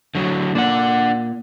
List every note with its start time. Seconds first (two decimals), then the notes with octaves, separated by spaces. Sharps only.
0.15 D3 F#3
0.55 A#2 D4 F#5